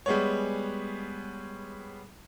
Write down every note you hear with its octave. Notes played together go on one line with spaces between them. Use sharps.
G3 G#3 B3 C#5